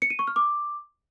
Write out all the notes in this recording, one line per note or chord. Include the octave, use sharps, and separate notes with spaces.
C#7
D#7
C#6
F6
D6